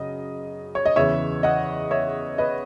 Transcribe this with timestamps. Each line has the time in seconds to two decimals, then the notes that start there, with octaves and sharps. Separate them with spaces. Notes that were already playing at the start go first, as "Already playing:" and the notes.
Already playing: F#2 C#3 F#3 D#5
0.75 C#5
0.86 D#5
0.96 E2 C#3 E3 C#5 E5
1.43 D#5 F#5
1.91 C#5 E5
2.38 B4 D#5